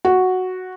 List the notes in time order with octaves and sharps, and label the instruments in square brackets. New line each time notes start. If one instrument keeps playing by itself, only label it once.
[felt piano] F#4